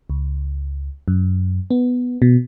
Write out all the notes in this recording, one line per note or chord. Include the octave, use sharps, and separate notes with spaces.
C#2
F#2
B3
B2